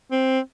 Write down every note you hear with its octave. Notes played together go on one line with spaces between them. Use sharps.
C4